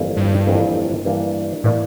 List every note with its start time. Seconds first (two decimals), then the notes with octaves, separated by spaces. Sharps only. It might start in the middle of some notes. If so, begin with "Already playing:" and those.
Already playing: G1 F2 E3 A#3 E4
0.17 G2
0.46 G1 F2 E3 A#3 E4
1.05 G2 E3 A#3 D4
1.64 A2 E3 A#3 D4